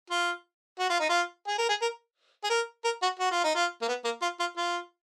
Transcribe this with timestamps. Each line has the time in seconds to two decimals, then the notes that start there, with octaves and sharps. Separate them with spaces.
0.10 F4
0.79 F#4
0.90 F4
1.00 D#4
1.09 F4
1.48 G#4
1.58 A#4
1.69 G#4
1.82 A#4
2.44 G#4
2.50 A#4
2.85 A#4
3.02 F#4
3.19 F#4
3.31 F4
3.44 D#4
3.55 F4
3.82 A#3
3.88 B3
4.05 A#3
4.22 F4
4.40 F4
4.57 F4